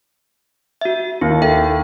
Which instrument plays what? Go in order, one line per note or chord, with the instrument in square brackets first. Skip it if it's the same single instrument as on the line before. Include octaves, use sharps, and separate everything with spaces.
[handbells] F#4 E5
[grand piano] D#2 [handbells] E4
[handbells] A4 E5 G5